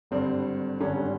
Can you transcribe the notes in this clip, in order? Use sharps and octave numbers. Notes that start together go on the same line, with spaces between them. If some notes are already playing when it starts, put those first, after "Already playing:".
G#1 G2 D3 G3 C4
G#1 G2 D3 G3 C#4